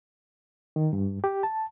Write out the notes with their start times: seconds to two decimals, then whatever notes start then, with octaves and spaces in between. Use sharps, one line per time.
0.76 D#3
0.93 G2
1.24 G4
1.43 A5